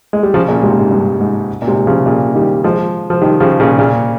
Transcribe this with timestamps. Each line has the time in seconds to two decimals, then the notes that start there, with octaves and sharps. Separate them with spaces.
0.13 G#3
0.23 G3
0.34 C#3 F3
0.48 A#2 C#3
0.63 G#2 C3
0.77 G#2
0.91 G2
1.21 G#2
1.62 A#2
1.68 G#2 C3
1.87 C#3 F3
2.06 A#2 C#3
2.35 D#3 G3
2.64 F3 G#3
3.10 F3
3.22 D#3 G3
3.40 C#3 F3
3.60 A#2 C#3
3.79 A#2 C#3